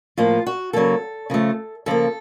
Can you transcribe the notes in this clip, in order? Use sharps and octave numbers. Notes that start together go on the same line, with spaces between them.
A2 F3 A#3 F4
F#4
C#3 F#3 A#3 A4
C#3 F3 A3
C#3 F3 A#3 A4